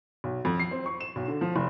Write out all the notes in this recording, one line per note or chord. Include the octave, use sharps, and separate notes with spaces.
B1
F2
C7
C4
C#6
E7
B1
D3
F3
F1